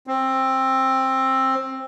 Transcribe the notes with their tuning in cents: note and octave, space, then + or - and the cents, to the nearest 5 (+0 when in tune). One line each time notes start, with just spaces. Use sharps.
C4 +15